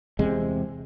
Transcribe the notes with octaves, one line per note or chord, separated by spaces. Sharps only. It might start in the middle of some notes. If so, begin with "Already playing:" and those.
E2 C3 G#3